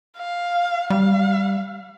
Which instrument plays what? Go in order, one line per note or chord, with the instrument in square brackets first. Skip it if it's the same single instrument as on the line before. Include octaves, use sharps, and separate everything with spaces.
[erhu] F5
[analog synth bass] G3 [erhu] F5